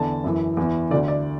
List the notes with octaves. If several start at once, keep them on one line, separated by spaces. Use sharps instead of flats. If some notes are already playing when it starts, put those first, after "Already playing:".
Already playing: E2 D3 A5
F#2 E3
E2 E3
D2 D3 D5
D5